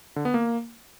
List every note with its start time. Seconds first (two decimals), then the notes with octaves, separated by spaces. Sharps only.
0.16 D3
0.25 B3
0.34 A#3